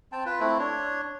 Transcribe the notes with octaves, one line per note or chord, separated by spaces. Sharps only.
C4 G5 A5
F4 B4
A3 C4 E4
D4 C#5